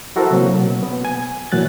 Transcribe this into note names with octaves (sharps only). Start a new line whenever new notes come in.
E4 F#4 A4 A#4 C5
C3 F#3 A#3
B2
B3
G#5
A#2 E3 F#3 F#6 A6